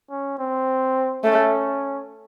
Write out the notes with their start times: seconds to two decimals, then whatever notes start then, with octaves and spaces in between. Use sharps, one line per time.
0.10 C#4
0.38 C4
1.24 A3 C#4